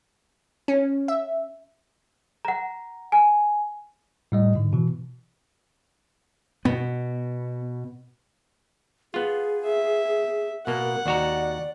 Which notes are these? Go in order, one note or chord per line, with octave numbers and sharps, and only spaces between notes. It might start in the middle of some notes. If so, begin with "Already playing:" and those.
C#4
E5
F#5 A#5
G#5
A2 G3 D#5
G#2 D3
B2 E3
B2 B3
B3 F4 G#4
E5
B2 A#3 A#4 F#5
D#2 F#4 D5 A#5